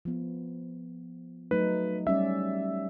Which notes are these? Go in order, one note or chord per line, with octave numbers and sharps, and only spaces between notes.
F3 B3
F#3 A3 D#4 B4
G3 C#4 D5 E5